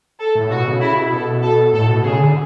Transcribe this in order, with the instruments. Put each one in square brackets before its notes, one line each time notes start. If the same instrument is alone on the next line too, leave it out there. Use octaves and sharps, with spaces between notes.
[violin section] A4
[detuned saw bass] A2
[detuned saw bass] B2 [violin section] F#4
[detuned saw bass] C#3
[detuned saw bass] C#3 [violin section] E4
[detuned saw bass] B2
[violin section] A4
A4
[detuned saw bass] A2 [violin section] A4
[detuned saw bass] B2
[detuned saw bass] C#3 [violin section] G#4
[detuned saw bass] D3